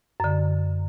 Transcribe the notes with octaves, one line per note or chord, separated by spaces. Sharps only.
F#2 D3